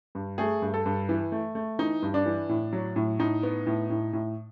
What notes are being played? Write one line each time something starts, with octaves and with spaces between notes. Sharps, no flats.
G2
A3 G#4
G2
A4
G2
E3
A3
A3
E3 D#4
G2
D4
E3
A2
F#3
A2
A2 D#4
B3
A2
A2
A2